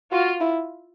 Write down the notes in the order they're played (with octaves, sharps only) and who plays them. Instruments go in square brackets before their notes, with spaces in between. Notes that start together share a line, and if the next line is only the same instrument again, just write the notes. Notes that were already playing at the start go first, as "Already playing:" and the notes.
[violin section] F4 [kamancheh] F#4
[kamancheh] E4